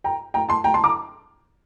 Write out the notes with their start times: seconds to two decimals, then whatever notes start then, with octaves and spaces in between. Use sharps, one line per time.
0.04 G5 A#5
0.34 G5 A#5
0.49 A5 C6
0.64 G5 A#5
0.74 A5 C6
0.84 A#5 D6